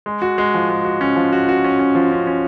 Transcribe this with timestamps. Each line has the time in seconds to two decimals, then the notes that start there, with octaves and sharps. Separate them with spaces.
0.06 G#3
0.22 F#4
0.38 G#3
0.54 F3
0.70 G#3
0.85 F#4
1.01 C#4
1.16 F3
1.33 F#4
1.49 F#4
1.64 C#4
1.79 C#4
1.95 F3
2.12 C#4
2.27 C#4